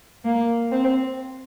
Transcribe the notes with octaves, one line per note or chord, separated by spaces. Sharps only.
A#3
C4